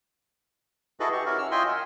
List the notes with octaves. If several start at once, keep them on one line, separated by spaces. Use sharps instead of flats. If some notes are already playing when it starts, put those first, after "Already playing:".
E4 F#4 G#4 A4 B4 D#5
G4 C#6
C#4 E4 F#4 A#4
E6 F6
F4 D#5 E5 G5 G#5 C6
A#4 F#5